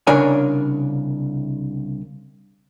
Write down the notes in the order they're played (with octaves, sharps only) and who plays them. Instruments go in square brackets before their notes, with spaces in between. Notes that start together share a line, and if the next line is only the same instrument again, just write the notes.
[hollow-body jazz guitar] C2 C#3 D4 A#4 C#5 G#5